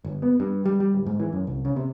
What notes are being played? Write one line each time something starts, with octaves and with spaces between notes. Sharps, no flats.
G1
B3
G2
G3
G3
D1
G#2
E3
F#2
C2
C#3
C3